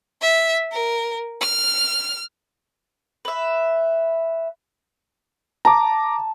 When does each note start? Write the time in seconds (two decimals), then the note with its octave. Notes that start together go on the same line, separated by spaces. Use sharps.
0.22 E5
0.72 A#4
1.41 F6
3.25 B4 E5
5.65 A5 A#5 D6